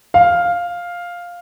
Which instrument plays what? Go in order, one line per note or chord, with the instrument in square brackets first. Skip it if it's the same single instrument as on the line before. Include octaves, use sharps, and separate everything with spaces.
[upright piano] F5